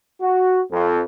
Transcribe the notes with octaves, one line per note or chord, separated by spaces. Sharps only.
F#4
F2